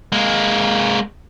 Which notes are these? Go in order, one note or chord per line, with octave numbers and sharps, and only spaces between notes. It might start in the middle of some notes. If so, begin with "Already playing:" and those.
G#3 A#3